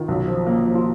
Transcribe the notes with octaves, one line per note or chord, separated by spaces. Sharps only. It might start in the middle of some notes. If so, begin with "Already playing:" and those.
Already playing: D#3 F4
B1
F3
A#3
F3
F4